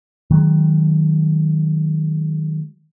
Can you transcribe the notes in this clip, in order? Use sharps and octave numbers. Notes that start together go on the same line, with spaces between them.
D#3 F#3 G#3